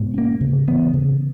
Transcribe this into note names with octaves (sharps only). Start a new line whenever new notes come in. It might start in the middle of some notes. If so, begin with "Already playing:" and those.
Already playing: G#2 B2
A#3 C#4
C#3
E3 B3
C#3